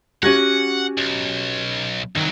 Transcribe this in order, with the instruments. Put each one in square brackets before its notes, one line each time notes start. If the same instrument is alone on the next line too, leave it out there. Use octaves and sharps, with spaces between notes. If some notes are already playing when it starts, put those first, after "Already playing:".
[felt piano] C#4 G#6 A#6 [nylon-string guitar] F#4 G4 G#5 [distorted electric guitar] F#5
[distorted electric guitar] B1
[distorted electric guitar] C2 F#3 [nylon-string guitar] D#3